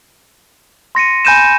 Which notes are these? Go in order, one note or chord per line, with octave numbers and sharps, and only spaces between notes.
C6 A#6 C#7 D#7
G#5 B5 G6 D#7 E7